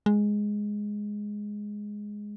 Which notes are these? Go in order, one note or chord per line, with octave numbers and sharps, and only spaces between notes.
G#3